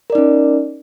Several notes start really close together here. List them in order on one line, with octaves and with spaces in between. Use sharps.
A#4 D5 D#4 C#4